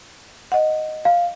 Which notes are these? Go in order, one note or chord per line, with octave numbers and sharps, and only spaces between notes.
D#5 F#5
F5